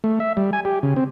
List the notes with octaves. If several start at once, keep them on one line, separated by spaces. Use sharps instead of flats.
A3
E5
G3
G#5
G4
C#3
C4